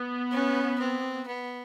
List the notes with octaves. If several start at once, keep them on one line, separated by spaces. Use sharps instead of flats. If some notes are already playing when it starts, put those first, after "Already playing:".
Already playing: B3
C#4
C4
B3